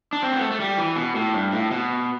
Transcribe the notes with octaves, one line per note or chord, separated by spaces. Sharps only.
D4
C4
B3
A3
A3
G3
E3
B2
A2
G2
A2
B2